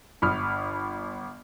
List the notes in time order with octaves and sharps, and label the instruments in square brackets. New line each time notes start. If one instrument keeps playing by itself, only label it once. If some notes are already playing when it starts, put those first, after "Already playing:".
[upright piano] G1 B5 D#6 F6